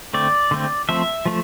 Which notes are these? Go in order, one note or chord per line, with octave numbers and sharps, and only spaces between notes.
D3 A3 C4 D5
D3 A3 C4
F3 A3 C4 E5
F3 A3